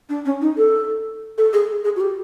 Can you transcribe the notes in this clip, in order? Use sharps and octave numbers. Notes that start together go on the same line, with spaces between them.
D4
C#4
D#4
A4
A4
G#4
G#4
F#4
G4